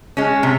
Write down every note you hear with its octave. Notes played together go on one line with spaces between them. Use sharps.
G#3 C#4
C3